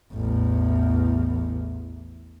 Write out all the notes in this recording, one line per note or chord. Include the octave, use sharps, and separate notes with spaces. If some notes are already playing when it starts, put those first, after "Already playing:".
A1 E2